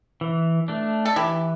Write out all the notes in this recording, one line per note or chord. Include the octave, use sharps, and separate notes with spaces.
E3
A3 D4
A4
E3 E4 G4